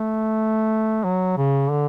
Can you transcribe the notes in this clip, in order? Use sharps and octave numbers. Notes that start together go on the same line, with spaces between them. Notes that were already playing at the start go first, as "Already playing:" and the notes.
Already playing: A3
F#3
C#3
D3